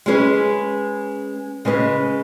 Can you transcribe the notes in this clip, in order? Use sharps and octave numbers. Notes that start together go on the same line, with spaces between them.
G#3 C#4 G#4 B4
C#3 G#3 C#4 G#4 B4